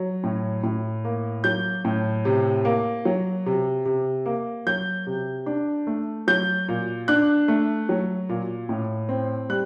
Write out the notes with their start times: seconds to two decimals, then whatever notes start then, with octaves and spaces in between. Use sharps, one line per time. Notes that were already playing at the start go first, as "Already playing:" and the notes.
Already playing: F#3
0.24 A2
0.63 A2
1.04 A#3
1.44 F#3 G6
1.85 A2
2.25 C3
2.65 A#3
3.05 F#3
3.46 C3
3.85 C3
4.26 A#3
4.66 F#3 G6
5.07 C3
5.46 D4
5.87 A3
6.28 F#3 G6
6.68 A#2
7.08 D4 F#6
7.48 A3
7.89 F#3
8.29 A#2
8.69 A2
9.09 C4
9.49 G3 F#6